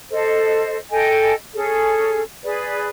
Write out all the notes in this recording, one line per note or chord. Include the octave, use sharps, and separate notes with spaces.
A4 C5 D#5
A4 D#5 G5 G#5
C#4 G#4 A4
G#4 B4 D5